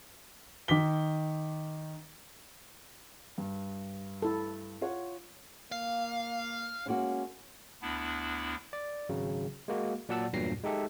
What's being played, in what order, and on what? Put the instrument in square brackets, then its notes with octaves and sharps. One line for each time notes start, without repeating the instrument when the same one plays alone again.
[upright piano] D#3 D6 B6 G7
[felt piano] G2
[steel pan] E4 A4
[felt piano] F4 C#5 F#5
[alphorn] A#3 [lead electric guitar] F5
[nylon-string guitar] G#3 A#3 F#4 [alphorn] C#4
[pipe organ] D2 B3 D4 E4
[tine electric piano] D5
G#1 C#3 F#3
G#3 A#3 F#4
A#2 F#3 D5 F#5 A5 E6
E2 G2 A#2 F#3 A#6 C7
G#3 D#4 G4 A4 E5